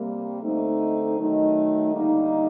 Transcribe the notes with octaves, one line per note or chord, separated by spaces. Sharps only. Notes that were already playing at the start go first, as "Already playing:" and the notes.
Already playing: C3 G3 A#3
D3 A3 C4 D#4
D#3 F#3 A3 D#4
D3 G3 A#3 D#4